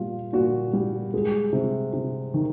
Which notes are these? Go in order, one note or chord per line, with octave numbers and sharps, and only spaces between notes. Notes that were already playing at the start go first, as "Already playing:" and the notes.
Already playing: A#2 G3 F4
A#2 F#4
G3
G#3
C3
C3
D#3